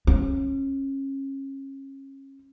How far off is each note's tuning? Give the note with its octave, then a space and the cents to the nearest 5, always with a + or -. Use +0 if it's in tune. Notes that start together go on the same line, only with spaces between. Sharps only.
C#4 -30